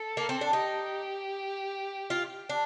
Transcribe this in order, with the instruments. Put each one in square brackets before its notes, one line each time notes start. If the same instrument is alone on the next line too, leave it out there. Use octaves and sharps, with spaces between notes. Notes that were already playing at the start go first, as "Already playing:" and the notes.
Already playing: [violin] A4
[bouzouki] A#3
C4
D4
[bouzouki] D#4 [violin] G4
[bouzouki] F4
D4